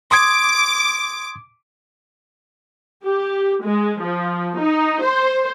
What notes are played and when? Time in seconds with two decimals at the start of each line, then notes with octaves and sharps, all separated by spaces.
0.11 C6 D6 D#6 G#6
3.04 G4
3.64 G#3
4.01 F3
4.58 D#4
5.03 C5